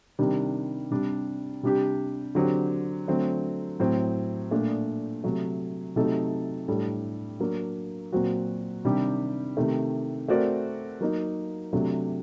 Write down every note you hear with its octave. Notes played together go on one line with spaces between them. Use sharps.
C3 D#3 G3 D4
C3 G3 D4
C3 G3 D4 G4
D3 F#3 C4 G4
D3 F#3 A3 C4
A2 F#3 C4
A#2 A3 D4
C3 F#3 A3
C3 F#3 A3 D#4 A4
A2 G3 D4 A4
F#3 A#3 D4
A#2 F#3 C4 F#4
C3 D#3 G3 D4 G4
C3 D#3 A3
A3 C4 F#4 A#4 D5
F#3 A#3 D#4
C3 F#3 A3 D4